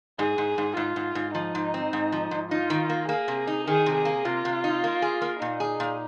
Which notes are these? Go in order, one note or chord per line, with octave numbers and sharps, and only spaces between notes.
G#2 G#4
G#2
G#2
G#2 F4
G#2
G#2
F3 D#4
G#2
C4
G#2
F3
G#2
D#4 F4
D#3
A#3
A#3 G#4
C3
D#4
D#3 G#4
C3
G#4
A#3
C3 F4
C3
D#4
A#3
G#4
A#3
A#2 D#4
G#4
A#2